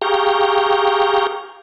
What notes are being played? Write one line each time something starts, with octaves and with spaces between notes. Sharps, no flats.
G4 G#4 F5 G5 A#5 C#6